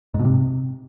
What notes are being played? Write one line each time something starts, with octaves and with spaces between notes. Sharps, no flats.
G#2
B2
C3